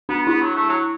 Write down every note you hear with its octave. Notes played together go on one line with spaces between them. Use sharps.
B3 D4
B3 E4
F#3
A3
F#3